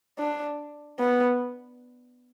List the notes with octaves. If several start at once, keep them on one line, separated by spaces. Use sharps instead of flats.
D4
B3